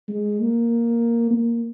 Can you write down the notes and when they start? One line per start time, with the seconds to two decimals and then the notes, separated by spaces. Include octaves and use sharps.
0.09 G#3
0.40 A#3
1.31 A#3